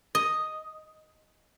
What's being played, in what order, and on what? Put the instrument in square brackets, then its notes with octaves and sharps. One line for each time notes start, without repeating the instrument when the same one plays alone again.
[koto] D#5